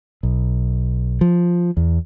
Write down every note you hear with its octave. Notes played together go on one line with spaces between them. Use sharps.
B1
F3
E2